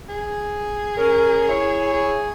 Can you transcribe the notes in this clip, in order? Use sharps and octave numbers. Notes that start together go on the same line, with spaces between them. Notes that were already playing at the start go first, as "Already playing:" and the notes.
G#4
C#4 A#4
E4 C#5
G#4